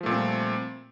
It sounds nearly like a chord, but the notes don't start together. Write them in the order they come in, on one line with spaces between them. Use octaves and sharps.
F3 A3 A#2 G3 C4